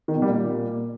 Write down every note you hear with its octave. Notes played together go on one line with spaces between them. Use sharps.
D#3
B2
G3
A#2